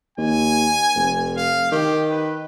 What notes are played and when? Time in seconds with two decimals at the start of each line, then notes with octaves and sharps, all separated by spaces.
0.18 D#2 G#5
0.96 F1
1.37 F5
1.72 D#3 G4
2.11 B4